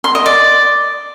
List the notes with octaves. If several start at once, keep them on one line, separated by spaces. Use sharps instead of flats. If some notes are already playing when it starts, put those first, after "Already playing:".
C6
D#5
D5